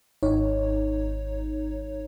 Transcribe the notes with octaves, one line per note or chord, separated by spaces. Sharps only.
G#1 D#4 C#5